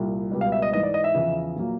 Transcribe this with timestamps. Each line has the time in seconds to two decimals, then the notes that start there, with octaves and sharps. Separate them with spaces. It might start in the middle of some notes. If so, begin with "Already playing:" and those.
Already playing: C2 A#2 G3
0.31 C#2 B2 G3
0.41 F5
0.52 E5
0.62 D#5
0.72 G#2 E3 G#3 D#5
0.83 D5
0.94 D#5
1.04 E5
1.14 E2 C#3 F3
1.56 A#2 F#3 A#3